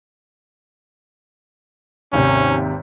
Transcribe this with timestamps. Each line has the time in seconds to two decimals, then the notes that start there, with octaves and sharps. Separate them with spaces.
2.13 G#1 D#2 C3 C#4